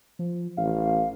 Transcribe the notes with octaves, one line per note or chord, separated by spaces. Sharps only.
F3
A1 F5